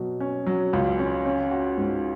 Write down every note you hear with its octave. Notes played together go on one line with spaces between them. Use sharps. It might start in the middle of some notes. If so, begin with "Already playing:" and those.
Already playing: B2 F#3
C#4
F#3
C#2
C#4
C#4
F#4
G#2